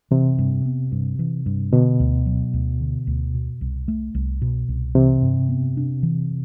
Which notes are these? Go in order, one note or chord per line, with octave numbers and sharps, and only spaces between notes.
C3 E3
G2
B3
G2
E3
G2
B2 D3
D2
F#3
D2
D3
D2
B2
C2
A3
C2
B2
C2
C3 E3
G2
B3
D4
E3